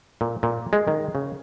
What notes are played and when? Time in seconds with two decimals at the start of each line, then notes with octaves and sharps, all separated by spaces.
0.21 A#2
0.43 A#2
0.73 G#3
0.88 D#3
1.15 C#3